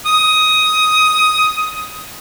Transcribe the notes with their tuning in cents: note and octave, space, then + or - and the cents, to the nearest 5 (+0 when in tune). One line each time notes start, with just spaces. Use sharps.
D#6 +15